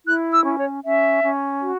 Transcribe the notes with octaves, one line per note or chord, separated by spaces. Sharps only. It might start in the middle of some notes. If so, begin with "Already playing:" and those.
E4 F#6
E6
C#4
C#5
C#4 E5
C#4
F#4